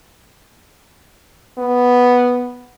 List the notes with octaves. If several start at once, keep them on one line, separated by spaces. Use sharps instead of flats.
B3